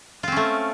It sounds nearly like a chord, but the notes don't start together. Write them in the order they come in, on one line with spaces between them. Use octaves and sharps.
F4 C4 C#4 A3